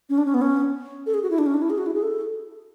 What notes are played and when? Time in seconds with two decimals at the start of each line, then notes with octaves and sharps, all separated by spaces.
0.09 C#4
0.18 D4
0.26 C#4
0.34 B3
0.42 C#4
1.06 A4
1.14 G#4
1.23 F#4
1.30 E4
1.38 D4
1.46 C#4
1.54 D4
1.62 E4
1.70 G#4
1.78 F#4
1.86 E4
1.94 G#4
2.03 A4